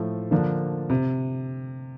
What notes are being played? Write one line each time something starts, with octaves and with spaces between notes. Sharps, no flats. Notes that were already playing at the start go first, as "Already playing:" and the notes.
Already playing: A2 F3 A3
D3 F3 A#3 D4
C3